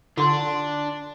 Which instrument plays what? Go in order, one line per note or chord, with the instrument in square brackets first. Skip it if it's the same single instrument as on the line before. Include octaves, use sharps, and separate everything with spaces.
[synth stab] D3 [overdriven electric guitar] D4 [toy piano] F4 C6